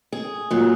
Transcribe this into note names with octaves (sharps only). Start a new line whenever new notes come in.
G#4
A#2 F#3